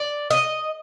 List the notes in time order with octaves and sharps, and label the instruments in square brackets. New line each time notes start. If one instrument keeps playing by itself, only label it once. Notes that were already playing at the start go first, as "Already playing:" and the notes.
Already playing: [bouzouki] D5
D#5